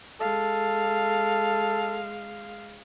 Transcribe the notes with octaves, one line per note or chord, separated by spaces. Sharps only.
G#3 A4 F5